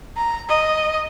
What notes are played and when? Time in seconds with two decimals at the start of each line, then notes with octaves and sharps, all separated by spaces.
0.17 A#5
0.49 D#5